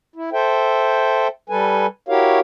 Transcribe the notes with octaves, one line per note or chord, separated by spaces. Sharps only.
E4
A4 C5 E5 G5
G3 A4 B4 G#5
E4 F#4 G4 A#4 C#5 F5